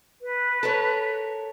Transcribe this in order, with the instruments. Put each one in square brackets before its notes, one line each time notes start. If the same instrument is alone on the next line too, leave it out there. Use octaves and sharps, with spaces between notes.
[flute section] B4
[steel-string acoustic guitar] A4 A#4 C#5